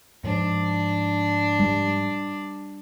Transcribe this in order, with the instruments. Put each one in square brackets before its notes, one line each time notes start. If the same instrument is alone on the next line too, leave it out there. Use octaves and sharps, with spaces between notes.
[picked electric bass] G#2 F3 [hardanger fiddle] D4
[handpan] G3